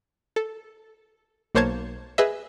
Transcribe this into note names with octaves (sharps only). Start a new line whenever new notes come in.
A4
B1 A#3 C5 C#5 A5 G#6
G#4 B4 D#5 E5